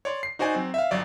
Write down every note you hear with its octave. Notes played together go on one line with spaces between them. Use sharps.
C#5 D5 C6
C7
D#4 F#4 C5 D5 G#5
F#3 C4
E5 F5
G1 F#3 D5